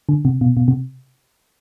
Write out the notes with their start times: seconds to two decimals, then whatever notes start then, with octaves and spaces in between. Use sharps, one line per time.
0.09 D3
0.25 C3
0.41 B2
0.57 B2
0.68 C3